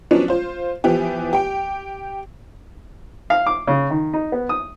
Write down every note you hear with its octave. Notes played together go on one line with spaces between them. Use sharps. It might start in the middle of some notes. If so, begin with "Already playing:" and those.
F3 F#3 B3 C#4 D4
F4 C5
E3 F3 B3 G4
G4 G5
F5
D6
C#3
D#3
D#4
B3
D#6